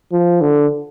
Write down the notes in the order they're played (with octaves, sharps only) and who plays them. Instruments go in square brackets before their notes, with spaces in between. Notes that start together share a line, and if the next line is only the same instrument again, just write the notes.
[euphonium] F3
D3